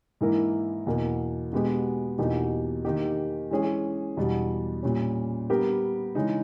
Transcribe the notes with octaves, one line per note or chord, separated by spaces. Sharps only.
G#2 E3 A#3 E4 A#4
E2 B2 A#3
B2 G#3 B3 G4
E2 B2 A#3 D#4 G4
D#3 A#3 D#4 G4
E3 G#3 C#4 G#4
E2 B2 G3
A#2 G3 C#4
G3 B3 G4 A#4
C#3 E3 G#3 D#4